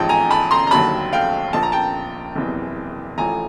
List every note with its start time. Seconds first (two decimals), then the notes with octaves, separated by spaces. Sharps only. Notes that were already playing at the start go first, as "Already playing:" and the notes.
Already playing: A1 G#2 F3 G5 A5
0.09 G#5 A#5
0.31 A5 B5
0.51 A#5 C6
0.67 A#5
0.71 F1 D#2 D3 F#3 A5 B5
1.13 F5 G5
1.53 A#1 A#2 F3 A5
1.63 A#5
1.72 G5 A5
2.36 F#1 E2 C3 E3
3.18 A1 A2 F3 G#5 A#5